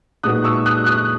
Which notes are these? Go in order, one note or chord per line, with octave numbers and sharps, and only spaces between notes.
A#2 G#3 D#4 F#4 B4 D#6 F#6
C#6 E6
D#6 F#6
D#6 F#6